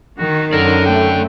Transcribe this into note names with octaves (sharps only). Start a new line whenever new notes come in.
D#3 F#4
F#2 A4 A#4 D5
A3 G5